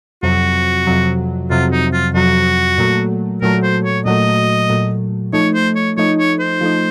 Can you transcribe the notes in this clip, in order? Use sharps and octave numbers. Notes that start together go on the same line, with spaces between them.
F2 C3 F#3 F#4
F2 C3 F#3
F2 C3 F#3 F4
D#4
F4
F2 C3 F#3 F#4
A#2 F#3 A3
A#2 F#3 A3 A#4
C5
C#5
A#2 F#3 A3 D#5
A#2 F#3 A3
F3 A3 D#4 C#5
C5
C#5
F3 A3 D#4 C#5
C#5
C5
F3 A3 D#4